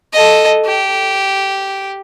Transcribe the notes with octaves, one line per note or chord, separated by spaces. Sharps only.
A4 D#5
G4